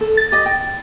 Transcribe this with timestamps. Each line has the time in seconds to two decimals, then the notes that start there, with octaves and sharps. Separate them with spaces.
0.01 A4
0.17 A6
0.32 G4 D#5
0.46 G5